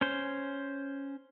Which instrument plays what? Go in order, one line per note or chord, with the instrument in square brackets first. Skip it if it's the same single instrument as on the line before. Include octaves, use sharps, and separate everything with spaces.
[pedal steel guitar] C#4 C5